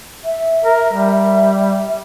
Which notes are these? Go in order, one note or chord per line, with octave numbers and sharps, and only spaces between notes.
E5
A#4
G3